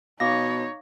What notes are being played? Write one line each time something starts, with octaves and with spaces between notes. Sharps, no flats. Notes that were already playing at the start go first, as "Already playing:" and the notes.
B2 D#4 C#5 F5 D6 A#6